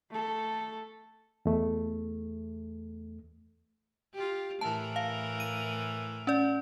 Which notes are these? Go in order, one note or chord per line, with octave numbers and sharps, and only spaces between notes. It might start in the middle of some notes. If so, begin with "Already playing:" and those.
A3 A4
E2 A3
F4 G4
A2 E3 A#4 A5
F5
D#7
C#4 D5